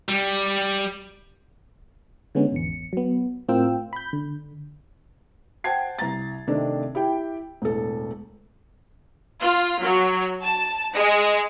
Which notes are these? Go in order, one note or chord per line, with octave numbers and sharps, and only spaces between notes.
G3
D3 G#3 B3 C#4
G#1 E2 C#7
F#3 B3
A2 C4 F4 A#4 G5 E6
B5 G6
D3
C5 F#5 G5 A5 G#6 C7
C2 A#5 A6
C3 D#3 A3 C4 D4
E4 G4 G5
E1 A2 A4
F4
F#3
A5
G#3